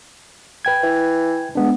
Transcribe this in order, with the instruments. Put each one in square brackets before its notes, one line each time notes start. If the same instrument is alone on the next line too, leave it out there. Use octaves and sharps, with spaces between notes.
[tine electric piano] B4 G5 G#6
[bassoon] E3
[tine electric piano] G#3 B3 D4